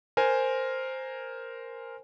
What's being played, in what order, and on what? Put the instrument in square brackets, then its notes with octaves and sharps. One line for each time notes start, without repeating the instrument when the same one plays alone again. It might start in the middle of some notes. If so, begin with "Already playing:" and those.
[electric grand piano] A#4 C5 G#5